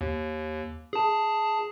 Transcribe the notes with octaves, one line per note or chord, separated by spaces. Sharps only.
D#2
G#4 A5